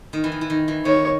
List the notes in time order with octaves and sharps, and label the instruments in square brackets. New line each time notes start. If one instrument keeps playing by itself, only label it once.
[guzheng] D#3
E3
D#3
E3
D#3
E3
[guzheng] D#3 [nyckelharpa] C#5